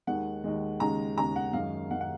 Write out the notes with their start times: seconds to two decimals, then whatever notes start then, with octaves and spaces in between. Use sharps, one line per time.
0.07 D#2 D#3 G#3 F#5
0.44 D#2 D#3 G#3
0.80 D#2 C#3 G#3 A#5
1.16 D#2 C#3 G#3 A#5
1.36 F#5
1.53 F#2 D#3 G#3 F5
1.90 F#2 D#3 G#3 F#5
2.01 F#5